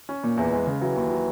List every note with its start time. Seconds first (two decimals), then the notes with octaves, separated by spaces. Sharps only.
0.09 C#4
0.23 A#2
0.37 E2 E3
0.53 G#3
0.67 C#3
0.81 E3 F#3
0.96 D#2
1.10 F#3